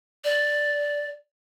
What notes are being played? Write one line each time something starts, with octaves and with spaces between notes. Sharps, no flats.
D5